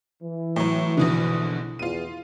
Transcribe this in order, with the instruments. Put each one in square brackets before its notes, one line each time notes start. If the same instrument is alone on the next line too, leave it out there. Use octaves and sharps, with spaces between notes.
[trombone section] E3
[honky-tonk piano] A2 F#3
A#1 B2 D3
[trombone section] E2 [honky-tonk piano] F4 D#7